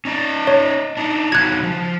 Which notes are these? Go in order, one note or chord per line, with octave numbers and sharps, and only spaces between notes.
C#4 D#4 D5
C#5
D4 D#4
C#3 D#4 F#4 F#6 G#6
F3